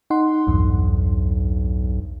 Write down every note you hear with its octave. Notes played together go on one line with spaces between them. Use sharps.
D#4 F#5 C6
B1 E2 G2